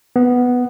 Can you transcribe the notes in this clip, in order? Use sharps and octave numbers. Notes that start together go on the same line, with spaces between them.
B3